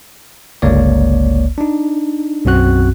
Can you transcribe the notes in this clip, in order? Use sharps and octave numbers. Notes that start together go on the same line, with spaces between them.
G1 C#2 A#3 C#5 D5
D4 D#4
B1 F#2 C4 F#4 F#6